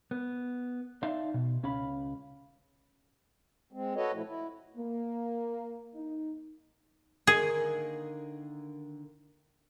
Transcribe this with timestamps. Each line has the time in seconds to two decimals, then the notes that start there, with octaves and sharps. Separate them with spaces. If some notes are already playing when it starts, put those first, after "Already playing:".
0.11 B3
1.03 D#4 D5 E5 F5 A5 C6
1.34 B2
1.63 C#2 C#4 F5 B5
3.73 G#3 C4
3.95 F#4 A4 B4 C#5 D#5
4.13 A#2 F3 A3 E4
4.27 E4
4.77 A#3
5.95 D#4
7.27 D3 D#3 A#3 G#4